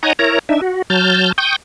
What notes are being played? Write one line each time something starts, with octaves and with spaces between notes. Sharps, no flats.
D#4 C#5 D#5 F#5 G#5 A#5
E4 A#4 C#5 A#5
D4 D#4 E5
F#4
F#3 A5 F6 G6
G5 C#6 D#6 G6